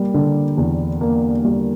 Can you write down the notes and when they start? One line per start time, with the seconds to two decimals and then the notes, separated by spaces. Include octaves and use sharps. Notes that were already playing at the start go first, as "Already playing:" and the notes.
Already playing: G3 A#3
0.14 D3
0.57 E2
1.01 A#3
1.45 G3